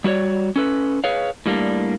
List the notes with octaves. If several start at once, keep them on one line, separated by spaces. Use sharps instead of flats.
G3 F#4 B4 C#5 D5
C#4 A4 B4
G#4 B4 C#5 F5
A2 G3 A#3 D4